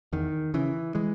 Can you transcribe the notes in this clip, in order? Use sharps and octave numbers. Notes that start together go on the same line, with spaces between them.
E2 D#3
C#3 E3
E3 G#3